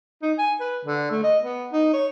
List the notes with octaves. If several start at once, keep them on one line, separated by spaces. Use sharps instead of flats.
D#4
G#5
B4
D3
A3
D#5
B3
D#4
C#5